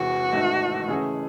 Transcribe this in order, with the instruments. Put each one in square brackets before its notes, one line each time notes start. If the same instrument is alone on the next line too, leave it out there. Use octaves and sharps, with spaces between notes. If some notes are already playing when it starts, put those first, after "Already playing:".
Already playing: [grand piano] E1 E2 C3 [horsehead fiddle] F#4
[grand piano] A1 G#2 D#3 A3
C#3 E3 A3 C#4 G#4